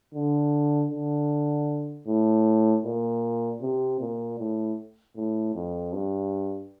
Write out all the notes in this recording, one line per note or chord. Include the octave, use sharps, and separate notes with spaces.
D3
D3
A2
A#2
C3
A#2
A2
A2
F2
G2